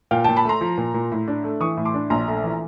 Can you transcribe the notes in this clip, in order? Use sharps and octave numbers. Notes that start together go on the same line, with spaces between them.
A#2 F5 G5
A#2 G5 A5
A5 B5
A3 A#5 C6
F3
A#2
A#2
A2
D4
A3
E3 C#6 D#6
A2
C6 D6
D4
A#1 A#5 C6
A3
E3